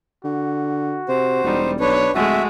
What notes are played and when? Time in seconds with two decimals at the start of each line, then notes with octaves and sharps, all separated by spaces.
0.24 D3 F#4
1.09 C3 C5
1.44 E1 G3 D#4
1.80 B1 D4 B4 C#5
2.15 D1 G#3 A3 F#4 E5